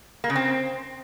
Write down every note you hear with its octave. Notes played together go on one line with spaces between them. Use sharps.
A#3
C#3
C4